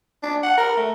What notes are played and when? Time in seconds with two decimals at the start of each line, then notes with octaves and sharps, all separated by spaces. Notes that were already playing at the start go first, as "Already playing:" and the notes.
0.23 D4
0.43 F#5
0.57 A#4
0.77 A3